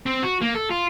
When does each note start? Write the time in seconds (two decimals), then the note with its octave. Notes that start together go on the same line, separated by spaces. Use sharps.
0.06 C4
0.23 F#4
0.41 A#3
0.55 A4
0.70 F4